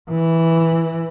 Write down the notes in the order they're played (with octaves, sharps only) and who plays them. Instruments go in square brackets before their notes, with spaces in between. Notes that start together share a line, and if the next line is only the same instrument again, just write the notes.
[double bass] E3